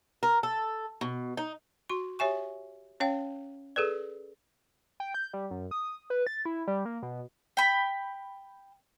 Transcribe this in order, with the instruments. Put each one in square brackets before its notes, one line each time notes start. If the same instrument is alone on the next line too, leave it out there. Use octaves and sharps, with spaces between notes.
[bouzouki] A#4
A4
B2
D#4
[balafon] F#4 C6
G4 C#5 E5 G#5 C#6
C#4 C#5 F5 G5
G#4 A4 B4 D5
[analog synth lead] G5
G6
G3
F#2
D#6
B4
A6
E4
G3
A#3
B2
[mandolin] G5 B5